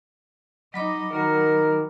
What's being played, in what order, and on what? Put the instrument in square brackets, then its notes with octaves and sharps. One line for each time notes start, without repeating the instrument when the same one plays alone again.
[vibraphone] F#3 B5 D6 [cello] D#4 D#5
[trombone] D#3 [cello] F#4 A#4